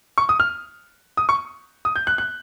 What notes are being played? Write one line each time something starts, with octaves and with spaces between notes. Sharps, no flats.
C#6
D#6
F6
D#6
C#6
D#6
G6
F#6
F#6